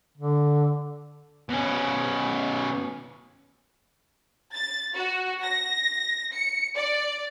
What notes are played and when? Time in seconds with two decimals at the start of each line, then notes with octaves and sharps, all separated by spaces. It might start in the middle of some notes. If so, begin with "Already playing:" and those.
0.17 D3
1.49 B2 C#4
4.54 A6
4.96 F#4
5.43 A#6
6.34 C#7
6.76 D5